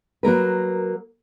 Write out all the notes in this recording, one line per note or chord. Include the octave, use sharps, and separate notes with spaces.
F#3 A#3 A#4 B4